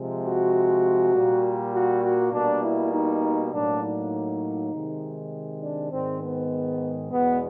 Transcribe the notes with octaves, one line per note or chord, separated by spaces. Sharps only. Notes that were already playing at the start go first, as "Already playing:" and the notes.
Already playing: C3 F3 G#3
F#4
A#2 G3 A#3
F#4
F#4
B2 G3 A#3 D4
E4
D#4
A2 F#3 A#3 D4
D#4
C3 D#3 G#3
D4
G#2 D#3 G#3 C4
B3
E2 B2 G#3 B3